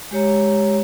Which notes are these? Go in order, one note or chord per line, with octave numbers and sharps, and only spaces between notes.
G#3 G4 C#5 A#5